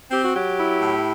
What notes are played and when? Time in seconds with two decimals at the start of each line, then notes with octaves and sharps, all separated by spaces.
0.11 C4 G4
0.23 F#4
0.34 F#3 G4
0.58 E4
0.82 A2